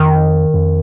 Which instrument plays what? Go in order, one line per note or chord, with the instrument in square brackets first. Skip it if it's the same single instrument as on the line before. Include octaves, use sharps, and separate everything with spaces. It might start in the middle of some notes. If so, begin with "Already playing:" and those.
Already playing: [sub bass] F2 [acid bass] D#3
[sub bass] F2